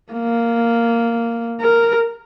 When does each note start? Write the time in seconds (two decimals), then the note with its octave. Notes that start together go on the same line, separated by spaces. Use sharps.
0.13 A#3
1.61 A#4